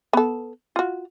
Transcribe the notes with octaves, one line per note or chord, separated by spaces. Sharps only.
B3 A4
F4 F#4